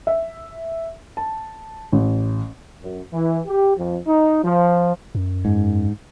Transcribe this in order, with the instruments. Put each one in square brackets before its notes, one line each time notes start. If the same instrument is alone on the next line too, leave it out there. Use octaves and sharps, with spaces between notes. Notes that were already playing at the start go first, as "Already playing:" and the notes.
[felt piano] E5
A5
A1
[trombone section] F#2
E3
G4
F2
D#4
F3
[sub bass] F#2
[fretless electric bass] G#2